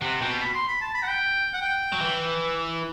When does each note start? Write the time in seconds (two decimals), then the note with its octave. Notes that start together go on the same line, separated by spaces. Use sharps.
0.01 C3 F#5
0.21 B2 G5
0.41 B5
0.54 C6
0.68 B5
0.81 A5
0.95 B5
1.03 F#5
1.08 G5
1.53 F#5
1.62 G5
1.92 F#3
2.01 E3